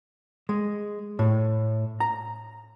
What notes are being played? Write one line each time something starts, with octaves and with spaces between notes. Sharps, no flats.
G#3
A2
A#5